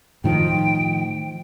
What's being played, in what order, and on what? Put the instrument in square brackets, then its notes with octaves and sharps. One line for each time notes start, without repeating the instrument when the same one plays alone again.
[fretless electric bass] A2 D#3 F3 [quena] G5